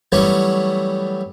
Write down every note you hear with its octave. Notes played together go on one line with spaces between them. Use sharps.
E3 F#3 G3 A3 B3 C#4